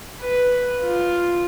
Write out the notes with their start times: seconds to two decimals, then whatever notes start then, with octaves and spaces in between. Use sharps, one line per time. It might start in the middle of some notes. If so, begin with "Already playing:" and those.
0.21 B4
0.83 F4